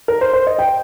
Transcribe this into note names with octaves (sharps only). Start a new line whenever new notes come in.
A#4
C5
C5
D#5
G5